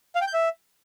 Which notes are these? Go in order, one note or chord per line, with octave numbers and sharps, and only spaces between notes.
F5
G5
G6
E5